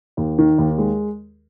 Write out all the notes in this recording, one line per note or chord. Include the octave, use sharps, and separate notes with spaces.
D#2
D#3
D#2
G#3